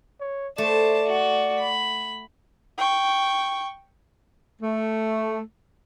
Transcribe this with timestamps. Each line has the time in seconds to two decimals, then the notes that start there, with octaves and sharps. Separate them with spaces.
0.20 C#5
0.58 A3 C5 D5 A5
1.04 F#4
1.59 B5
2.78 G5 C#6
4.60 A3